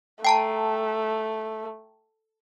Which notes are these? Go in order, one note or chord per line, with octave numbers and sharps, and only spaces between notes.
A3 G5 A5 A#5